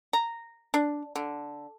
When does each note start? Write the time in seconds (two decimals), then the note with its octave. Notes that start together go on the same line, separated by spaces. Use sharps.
0.13 A#5
0.74 D4
1.16 D3